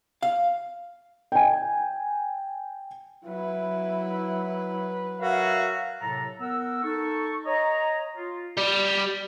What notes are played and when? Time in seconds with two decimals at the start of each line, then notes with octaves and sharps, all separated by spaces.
0.23 F5
1.32 G5 G#5
3.25 F#3 E4 B4
5.21 F#4 A#4 C#5 E5 F5
6.01 A2 C3 F#3 A4 A#5
6.40 B3 A#4 F#5 E6
6.83 D#4 A4 C#6
7.46 C#5 D#5 A#5
8.17 F4
8.57 G3